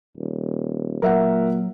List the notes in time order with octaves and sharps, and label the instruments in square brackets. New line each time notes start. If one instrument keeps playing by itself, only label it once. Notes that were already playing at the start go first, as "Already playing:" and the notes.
[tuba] D#1
[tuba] A#2 [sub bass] F#3 [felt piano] A#4 E5 F#5